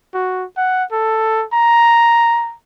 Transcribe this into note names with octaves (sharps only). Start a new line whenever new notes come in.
F#4
F#5
A4
A#5